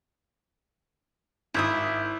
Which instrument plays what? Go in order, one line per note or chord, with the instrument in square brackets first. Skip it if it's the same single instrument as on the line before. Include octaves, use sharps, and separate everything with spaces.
[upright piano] G#1 [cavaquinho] E4 E5 D#6